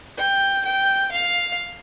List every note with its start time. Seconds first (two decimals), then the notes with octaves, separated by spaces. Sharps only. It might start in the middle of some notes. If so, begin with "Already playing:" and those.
0.17 G5
0.65 G5
1.12 F5